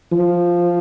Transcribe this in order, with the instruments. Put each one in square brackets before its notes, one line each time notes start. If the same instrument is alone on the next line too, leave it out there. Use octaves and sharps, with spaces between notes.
[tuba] F3